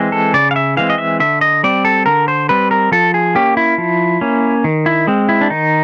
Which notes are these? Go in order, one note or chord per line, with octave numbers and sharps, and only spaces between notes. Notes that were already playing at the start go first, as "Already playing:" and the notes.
Already playing: E3 G#3 C4
A4
C#3 D5
F5
E5
E3 G#3 C4 F5
D#5
E5
D3 E5
D#5
G3 C4 D5
A4
D3 A#4
C5
G3 C4 B4
A#4
F3 A4
G#4
A#3 C#4 G4
E4
F3
A#3 C#4
D#3
E4
G#3 C4
E4
D4
D#3 D#4